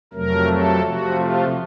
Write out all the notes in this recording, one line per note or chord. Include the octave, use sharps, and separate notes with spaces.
F2 C3 F#3 A3 A#4
A4
C3 F3 A3 F#4
F4